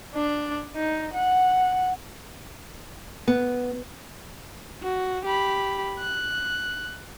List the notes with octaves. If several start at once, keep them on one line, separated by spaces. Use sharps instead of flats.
D4
D#4
F#5
B3
F#4
G4 B5
F#6